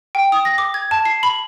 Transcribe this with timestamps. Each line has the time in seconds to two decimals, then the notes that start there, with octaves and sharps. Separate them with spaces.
0.15 G5
0.32 D#6
0.45 A#6
0.58 D6
0.74 G#6
0.91 A5
1.05 C7
1.23 B5